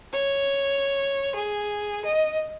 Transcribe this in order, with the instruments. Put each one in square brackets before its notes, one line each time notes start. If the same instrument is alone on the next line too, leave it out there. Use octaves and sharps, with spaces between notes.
[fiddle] C#5
G#4
D#5